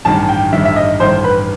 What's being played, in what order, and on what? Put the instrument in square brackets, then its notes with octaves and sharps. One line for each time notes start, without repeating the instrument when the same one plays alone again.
[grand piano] A1 G2 D#3 [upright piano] A5
[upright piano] G5
[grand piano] A1 G2 D#3 [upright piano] E5
[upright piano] E5
D#5
[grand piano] A1 G2 D#3 [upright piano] C5
[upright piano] B4